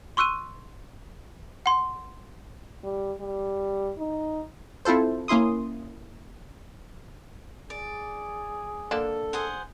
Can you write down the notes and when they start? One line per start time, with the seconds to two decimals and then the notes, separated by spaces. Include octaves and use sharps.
0.17 C6 C#6 E6 F#6 D#7
1.66 F#5 C6
2.83 G3
3.20 G3
3.98 D#4
4.85 C4 E4 F4 A4 C5
5.28 A#3 C#4 E4 C6 D#6
7.70 G#4 D5
8.91 D3 A#3 A4 A5
9.33 G#4 C5 F#5